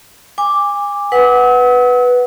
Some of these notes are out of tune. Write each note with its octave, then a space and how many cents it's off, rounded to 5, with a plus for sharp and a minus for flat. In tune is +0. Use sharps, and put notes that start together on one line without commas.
G#5 -30 D6 +0
B4 +0 F#5 +0 E6 -45